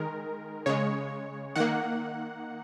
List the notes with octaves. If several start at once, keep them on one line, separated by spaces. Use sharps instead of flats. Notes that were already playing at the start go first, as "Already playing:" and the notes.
Already playing: D#3 G#3 A#4
C#3 G#3 C#5
D#3 A#3 F#5